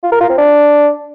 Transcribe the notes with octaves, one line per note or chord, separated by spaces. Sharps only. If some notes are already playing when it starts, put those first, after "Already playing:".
F4
A#4
F4
C4
D4